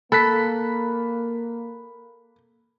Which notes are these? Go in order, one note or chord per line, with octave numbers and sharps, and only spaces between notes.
A#3 A4 B5 F#6 B6